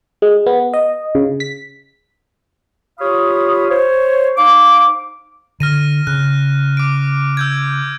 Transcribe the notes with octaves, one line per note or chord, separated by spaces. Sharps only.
G#3
B3
D#5
C#3
B6
F4 G4 C#5 F5 B5 D#6
C5 C#5
D#4 C5 F5 D6
D3 F6 A#6 D#7
C#3 F#6
D6 D7
E6 G6 G#6